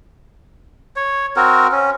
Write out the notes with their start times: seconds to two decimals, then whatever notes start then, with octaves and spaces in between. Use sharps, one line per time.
0.96 C#5
1.36 C4 F#4 A#4
1.72 C#4